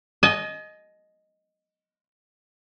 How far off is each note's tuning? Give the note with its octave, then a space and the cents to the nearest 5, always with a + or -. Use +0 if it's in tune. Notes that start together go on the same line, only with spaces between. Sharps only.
D#5 +0 G#5 +45